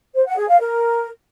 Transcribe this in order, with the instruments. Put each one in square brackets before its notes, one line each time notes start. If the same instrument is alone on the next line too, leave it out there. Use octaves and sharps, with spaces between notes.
[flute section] C5
F#5
G#4
F5
A#4